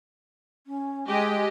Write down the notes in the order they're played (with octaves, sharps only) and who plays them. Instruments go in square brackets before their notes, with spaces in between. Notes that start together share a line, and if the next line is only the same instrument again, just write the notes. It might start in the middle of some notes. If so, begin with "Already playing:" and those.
[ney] C#4
[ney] G#3 [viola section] G4 D#5